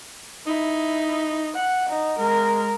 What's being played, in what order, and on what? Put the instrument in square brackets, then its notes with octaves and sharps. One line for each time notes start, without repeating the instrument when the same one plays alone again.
[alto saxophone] D#4 [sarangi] E4
[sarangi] F#5
D#4
[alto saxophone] G#3 [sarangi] A#4